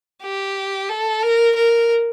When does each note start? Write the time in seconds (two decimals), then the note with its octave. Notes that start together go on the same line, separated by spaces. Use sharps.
0.23 G4
0.89 A4
1.22 A#4
1.56 A#4